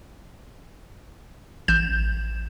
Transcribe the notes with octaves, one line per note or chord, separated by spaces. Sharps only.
A1 G6 E7